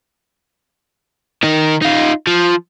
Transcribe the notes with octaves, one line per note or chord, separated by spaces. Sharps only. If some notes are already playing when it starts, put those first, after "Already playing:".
D#3 D#4
D#4 F4
F3